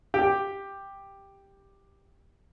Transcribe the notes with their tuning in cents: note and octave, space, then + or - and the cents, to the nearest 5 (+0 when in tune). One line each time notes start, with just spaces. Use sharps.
G4 +5